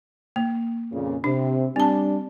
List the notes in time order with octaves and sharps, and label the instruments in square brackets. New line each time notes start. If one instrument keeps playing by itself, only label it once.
[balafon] A#3
[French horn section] F2 A#2 C#3
[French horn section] C3 [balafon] D4
[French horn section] G3 D4 [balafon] C4 A5